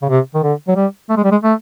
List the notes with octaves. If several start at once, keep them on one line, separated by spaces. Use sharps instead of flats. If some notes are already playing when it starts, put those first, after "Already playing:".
C#3
C3
D#3
D3
F#3
G3
A3
G#3
G3
G#3
A3